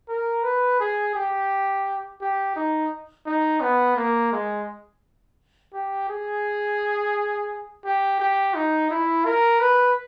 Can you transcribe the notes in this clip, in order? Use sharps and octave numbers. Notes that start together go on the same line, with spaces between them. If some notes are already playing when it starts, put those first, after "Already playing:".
A#4
B4
G#4
G4
G4
D#4
D#4
B3
A#3
G#3
G4
G#4
G4
G4
D#4
E4
A#4
B4